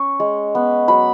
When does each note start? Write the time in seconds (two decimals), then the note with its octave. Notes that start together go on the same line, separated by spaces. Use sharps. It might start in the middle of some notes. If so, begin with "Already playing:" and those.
Already playing: C#4 C#6
0.20 G#3
0.55 B3
0.88 F#3 B5